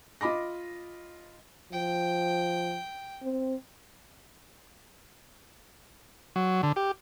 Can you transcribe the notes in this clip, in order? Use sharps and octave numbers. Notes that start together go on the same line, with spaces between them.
F4 D#5 B5 D6 A#6
F3 G5
C4
F#3
D3
G4